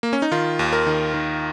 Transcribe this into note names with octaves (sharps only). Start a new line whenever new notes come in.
A#3
C#4
D#4
D#3 F4
D#2
A#4
D#3
D#3